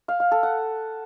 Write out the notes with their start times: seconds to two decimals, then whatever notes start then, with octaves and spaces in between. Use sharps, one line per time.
0.08 F5
0.20 F5
0.31 A4
0.43 F#5